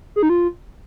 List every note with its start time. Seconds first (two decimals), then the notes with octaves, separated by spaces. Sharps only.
0.16 G#4
0.23 D#4
0.29 F4